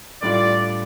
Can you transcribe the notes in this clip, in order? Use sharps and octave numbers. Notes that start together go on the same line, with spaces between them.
A2 G3 D4 F4 D5